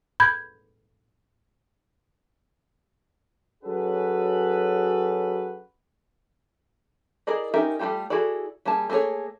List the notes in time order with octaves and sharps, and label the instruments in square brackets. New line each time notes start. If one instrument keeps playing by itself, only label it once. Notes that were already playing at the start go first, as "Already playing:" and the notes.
[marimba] B5 G6 G#6
[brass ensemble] F#3 C#4 F#4 G#4 A4 B4
[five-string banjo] E4 G#4 A#4 D5 D#5
C#4 D#4 G4 A#4 E5
G3 A3 A#3 F4 G4
E4 F#4 G#4 A4 D5
G3 A#3 G#4 A5
A3 A#3 E4 G#4 C#5